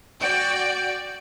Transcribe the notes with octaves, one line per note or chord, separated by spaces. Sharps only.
F#4 D5 G5